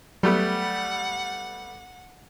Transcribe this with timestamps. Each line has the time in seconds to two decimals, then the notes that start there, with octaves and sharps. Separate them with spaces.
0.23 F#3 G3 A3 B3 F#5